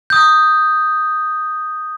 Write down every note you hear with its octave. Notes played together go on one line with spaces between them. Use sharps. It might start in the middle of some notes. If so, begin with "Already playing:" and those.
D#6 G6